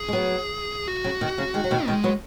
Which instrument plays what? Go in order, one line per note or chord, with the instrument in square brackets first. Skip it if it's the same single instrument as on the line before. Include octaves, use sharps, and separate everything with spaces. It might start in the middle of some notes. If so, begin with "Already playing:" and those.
Already playing: [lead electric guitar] G#4
[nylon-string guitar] G#3
F#3 B3
[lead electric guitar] F#4
[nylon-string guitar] C#3 F#3
B2 D#3
C#3 F#3
D#3 G#3
F#3
B2 D#3
[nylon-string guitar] B2 D#3 [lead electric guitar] G#3
[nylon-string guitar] F#3 B3